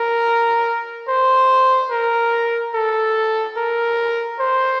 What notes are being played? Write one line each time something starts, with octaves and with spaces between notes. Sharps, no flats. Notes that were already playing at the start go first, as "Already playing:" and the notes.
Already playing: A#4
C5
A#4
A4
A#4
C5